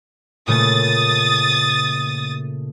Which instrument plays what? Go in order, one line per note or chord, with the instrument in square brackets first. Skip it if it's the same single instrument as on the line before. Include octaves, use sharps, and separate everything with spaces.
[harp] A#2 C#3 A3 [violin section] D#6 A6